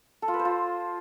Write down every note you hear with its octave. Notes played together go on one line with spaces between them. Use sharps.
A4
F4
B4
C5
F4